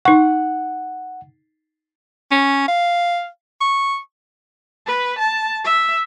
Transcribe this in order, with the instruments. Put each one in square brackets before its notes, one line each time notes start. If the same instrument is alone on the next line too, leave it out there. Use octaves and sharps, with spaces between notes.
[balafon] D#4 C#6 [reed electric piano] F#5
[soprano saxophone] C#4
F5
C#6
[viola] B4
A5
E5